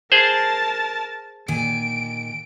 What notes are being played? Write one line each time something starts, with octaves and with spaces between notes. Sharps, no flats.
G#4 A#4 C5 A5
A#2 D#3 G#5 D7